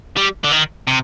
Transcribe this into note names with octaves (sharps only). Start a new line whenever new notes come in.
G3
D3
D#3
C3